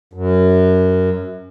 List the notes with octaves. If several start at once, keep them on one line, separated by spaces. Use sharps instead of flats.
F#2